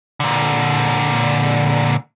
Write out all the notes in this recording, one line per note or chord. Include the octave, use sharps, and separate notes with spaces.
A#2 D3